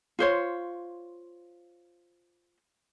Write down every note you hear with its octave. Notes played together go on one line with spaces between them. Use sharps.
F4 C5 C#5